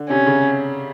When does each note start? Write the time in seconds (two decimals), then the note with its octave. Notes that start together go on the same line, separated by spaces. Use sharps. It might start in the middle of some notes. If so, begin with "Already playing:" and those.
Already playing: D3
0.10 C3 C#4
0.26 C#3